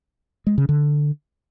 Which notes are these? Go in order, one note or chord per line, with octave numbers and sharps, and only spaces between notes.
G#3
C#3
D3